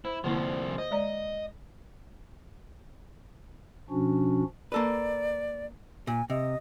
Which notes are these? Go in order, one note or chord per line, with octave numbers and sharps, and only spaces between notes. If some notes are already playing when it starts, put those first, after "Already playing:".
E4 C5
C2 D3 F3 A#3 E4
C5 D#5
G#3 D5 A#5
B2 F3 C#4 D4 F#4
A#3 A4 B4 D5
A#2 G#5
C3 D#5